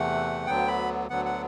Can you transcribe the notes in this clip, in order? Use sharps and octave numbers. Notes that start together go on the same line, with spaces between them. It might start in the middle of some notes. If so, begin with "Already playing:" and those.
Already playing: E2 C3 E3 A3 F#5
D2 D3 F#3 B3 G5
B5
D2 D3 F#3 B3 F#5
F#5